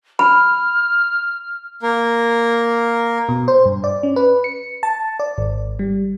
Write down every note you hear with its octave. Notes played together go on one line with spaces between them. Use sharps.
B5 F6
A#3 A#4
B2
C5
G2
D5
C#4
B4
C#7
A5
D5
G#1
G3